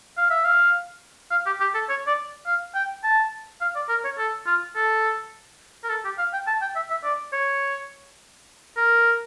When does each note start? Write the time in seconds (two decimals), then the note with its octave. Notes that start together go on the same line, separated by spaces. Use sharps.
0.17 F5
0.30 E5
0.45 F5
1.31 F5
1.46 G4
1.60 G4
1.74 A4
1.89 C#5
2.07 D5
2.46 F5
2.75 G5
3.04 A5
3.61 F5
3.76 D5
3.89 A#4
4.04 C#5
4.18 A4
4.46 F4
4.76 A4
5.84 A#4
5.89 A4
6.05 G4
6.18 F5
6.33 G5
6.47 A5
6.62 G5
6.76 E5
6.91 E5
7.04 D5
7.33 C#5
8.77 A#4